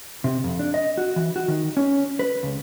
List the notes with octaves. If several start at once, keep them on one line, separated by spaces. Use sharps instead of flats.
C3
F2
D4
D#5
F#4
E3
F#4
D#3
C#4
B4
C#2